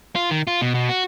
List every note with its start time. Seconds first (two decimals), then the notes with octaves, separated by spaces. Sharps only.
0.15 F4
0.31 D#3
0.47 F4
0.61 B2
0.74 B2
0.89 F#4